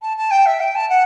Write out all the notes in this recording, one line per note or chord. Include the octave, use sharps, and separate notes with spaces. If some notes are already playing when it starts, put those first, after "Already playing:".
A5
A5
G5
E5
G5
A5
F#5